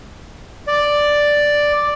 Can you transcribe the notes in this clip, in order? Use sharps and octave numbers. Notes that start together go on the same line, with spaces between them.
D5